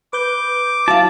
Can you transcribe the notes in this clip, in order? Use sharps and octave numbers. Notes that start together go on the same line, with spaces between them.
B4 D6 G6
F#3 E4 F5 A5